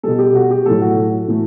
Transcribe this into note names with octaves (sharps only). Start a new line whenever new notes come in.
B2 G3 A4
G4
F#4
G4
A2 F#3 A3 A4
F#4
A2 E3 A3